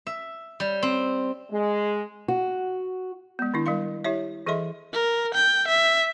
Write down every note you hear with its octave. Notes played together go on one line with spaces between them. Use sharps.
E5
G3
C4
G#3
F#4
G#3 B3
D#3 D4 E4
G3 A#4 F5 C6
E4 G4 C#5 E5
E3 G#4 A4 D#5 E5 C6
A#4
G5
E5